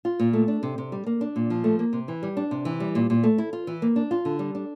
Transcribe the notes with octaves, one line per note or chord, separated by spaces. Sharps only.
F4
A#2
A3
D4
C3
C3
G3
A#3
D4
A#2
F3
A3
A#3
C3
E3
G3
D4
C3
E3
G3
A#2
A#2
A3
E4
F4
E3
A#3
D4
F4
D3
G3
D4